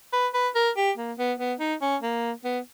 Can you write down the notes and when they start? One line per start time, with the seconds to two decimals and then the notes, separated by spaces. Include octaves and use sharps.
0.13 B4
0.34 B4
0.55 A#4
0.77 G4
0.98 A#3
1.19 B3
1.39 B3
1.60 D#4
1.82 C#4
2.02 A#3
2.44 B3